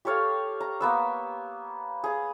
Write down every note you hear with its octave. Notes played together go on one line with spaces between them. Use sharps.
G4 A4 C#5 F5
A#5
A#3 B3 E6
G#4 F5